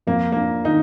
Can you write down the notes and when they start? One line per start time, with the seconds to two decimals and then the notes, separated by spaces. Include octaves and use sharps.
0.07 F2 A#3
0.32 A#3 D4
0.65 D#3 D#4